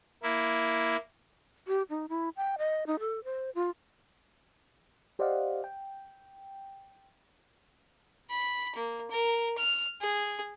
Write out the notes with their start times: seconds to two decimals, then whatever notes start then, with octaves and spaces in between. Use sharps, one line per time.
0.23 A#3 E4
1.68 G4
1.90 D#4
2.09 E4
2.37 G5
2.58 D#5
2.87 D#4
3.00 A4
3.24 C5
3.55 F4
5.19 G4 C5 D5 D#5 F5 F#5
5.64 G5
8.30 B5
8.75 A#3
9.11 A#4
9.58 F6
10.01 G#4